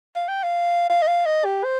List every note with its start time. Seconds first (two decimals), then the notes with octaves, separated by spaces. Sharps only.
0.15 F5
0.28 G5
0.43 F5
0.90 F5
1.02 D#5
1.07 F5
1.26 D#5
1.45 G4
1.64 C5